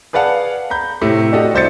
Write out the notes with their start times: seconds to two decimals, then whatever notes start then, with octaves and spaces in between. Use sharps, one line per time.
0.13 G#4 B4 D5 F5 F#5 A5
0.70 A#5 B5 G6
1.02 A2 C3 A3
1.32 D4 F#4 G4 A4 D#5
1.54 C2 D4 C5 E5 A6 C#7